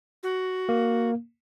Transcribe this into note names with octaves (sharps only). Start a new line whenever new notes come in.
F#4
A#3